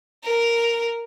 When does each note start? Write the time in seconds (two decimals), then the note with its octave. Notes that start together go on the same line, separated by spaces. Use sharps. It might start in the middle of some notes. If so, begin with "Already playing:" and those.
0.24 A#4